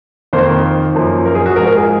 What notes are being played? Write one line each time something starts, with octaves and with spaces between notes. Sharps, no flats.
F2 D#3 A#3 C5
F#2 F3 A#3
A#4
G#4
F#4
G#2 F3 G#3 A#4
A#4
G#4